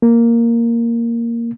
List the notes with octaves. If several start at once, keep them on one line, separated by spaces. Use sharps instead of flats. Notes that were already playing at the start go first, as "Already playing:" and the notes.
A#3